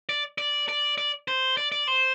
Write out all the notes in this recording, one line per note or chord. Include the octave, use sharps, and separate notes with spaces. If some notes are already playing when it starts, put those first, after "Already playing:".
D5
D5
D5
D5
C5
D5
D5
C5